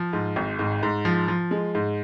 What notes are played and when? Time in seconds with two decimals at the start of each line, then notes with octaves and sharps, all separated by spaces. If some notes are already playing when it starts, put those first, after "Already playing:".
Already playing: F3
0.13 G#2
0.36 G#1
0.59 G#2
0.83 G#2
1.05 F3
1.28 F3
1.51 G#3
1.75 G#2